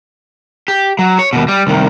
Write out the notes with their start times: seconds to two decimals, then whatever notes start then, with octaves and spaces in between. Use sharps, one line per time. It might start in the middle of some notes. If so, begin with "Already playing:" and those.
0.68 G4
0.99 F#3
1.19 C#5
1.33 D#2 B2
1.48 G3
1.67 C2 D#3